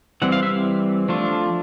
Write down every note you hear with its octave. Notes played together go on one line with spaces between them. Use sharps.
E3 G3 C4 F#5
F5
E5
F3 A3 D4 F4